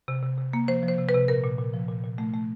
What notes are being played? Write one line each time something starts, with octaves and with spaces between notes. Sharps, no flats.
C3
C3
C3
A#3
F3 C5
F3
C5
C3
B4
C3
A#2 A#4
A#2
A#2
F3
A#2
A#2
A3
A3